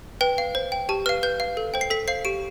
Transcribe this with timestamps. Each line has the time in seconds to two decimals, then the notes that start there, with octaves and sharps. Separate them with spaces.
0.21 B4 G5
0.38 F5
0.55 C5
0.72 G5
0.89 G4 A5
1.06 B4 F5 F6
1.23 B4 G6
1.40 F5
1.57 A4
1.74 C5 G5
1.81 C7
1.90 A4 B6
2.08 C5 F5 C7
2.25 G4 D7